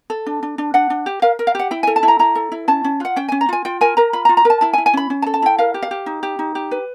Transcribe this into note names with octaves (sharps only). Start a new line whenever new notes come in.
A4
D4
D4
D4
D4 F#5
D4
G4
A#4 F5
A#4
F5
G4 F#5
E4 G5
G#5
A4
A5
E4
A#5
E4 A#5
A4
E4
C#4 A5
C#4
F4 F#5
C#4 G5
G#5
C#4
A#5
F4 G#5
F4 G5
A#4 G#5
A#4 A#5
F4 B5
A#5
F4
A#5
A#4 A5
E4 A5
G#5
E4
G#5
C#4 B5
C#4
A5
A4
A5
E4 G5
A#4 F5
G4
F5
G4
D#4
G4
D#4
G4
B4